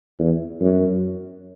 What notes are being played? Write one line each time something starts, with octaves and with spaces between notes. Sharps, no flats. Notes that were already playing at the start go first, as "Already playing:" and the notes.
E2
F#2